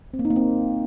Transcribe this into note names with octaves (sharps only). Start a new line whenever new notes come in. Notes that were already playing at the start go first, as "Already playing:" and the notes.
C4
A#3
D#4
A#3
C4